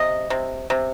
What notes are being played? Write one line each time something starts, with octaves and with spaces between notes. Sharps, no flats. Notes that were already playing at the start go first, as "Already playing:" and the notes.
Already playing: C3 D#5
C3
C3